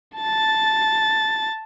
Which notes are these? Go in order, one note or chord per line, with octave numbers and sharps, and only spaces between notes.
A5 A6